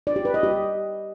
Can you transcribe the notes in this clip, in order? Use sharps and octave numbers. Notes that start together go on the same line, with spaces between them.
D5
G4
B4
D#5
G4